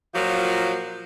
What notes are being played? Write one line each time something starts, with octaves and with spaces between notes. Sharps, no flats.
A#2 F3 F#3